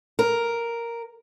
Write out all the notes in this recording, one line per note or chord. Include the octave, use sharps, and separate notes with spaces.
A#4